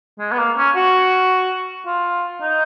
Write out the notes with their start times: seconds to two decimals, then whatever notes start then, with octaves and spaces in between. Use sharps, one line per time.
0.19 G#3
0.32 B3
0.39 A#3
0.57 C#4
0.76 F#4
1.86 F4
2.42 D#4